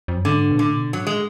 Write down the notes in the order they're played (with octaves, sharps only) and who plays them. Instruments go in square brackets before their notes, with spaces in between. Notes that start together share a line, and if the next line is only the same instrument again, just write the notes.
[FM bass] F2
F#2
[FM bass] G#2 [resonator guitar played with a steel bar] D3
[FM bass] B2
[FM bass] A2 [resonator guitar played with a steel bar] D3
[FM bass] B2
[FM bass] G#2 [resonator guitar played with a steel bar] F#3
[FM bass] A2 [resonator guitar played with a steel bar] G#3